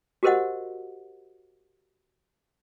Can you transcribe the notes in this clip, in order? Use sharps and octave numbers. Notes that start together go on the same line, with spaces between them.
F#4 G4 A#4 C5 D#5 F#5